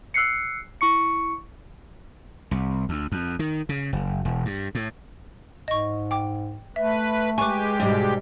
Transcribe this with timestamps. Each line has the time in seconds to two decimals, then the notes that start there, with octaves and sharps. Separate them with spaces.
0.14 E6 F#6 C7 C#7
0.81 E4 C#6 C#7
2.51 C2
2.89 D2
3.12 F2
3.39 D#3
3.69 C#3
3.93 F#1
4.25 E1
4.45 G2
4.75 A2
5.68 G#2 D#5 C#6
6.11 G5 D6
6.76 A3 B4 E5
7.38 G#3 G4 B4 G#5 C#6 D6
7.80 G#2 B2 G3